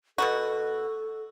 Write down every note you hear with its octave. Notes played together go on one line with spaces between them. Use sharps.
B2 B3 F#4 A4